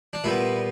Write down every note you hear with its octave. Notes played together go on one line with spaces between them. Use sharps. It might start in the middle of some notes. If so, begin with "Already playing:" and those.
D4
A#2 G3 B3 E4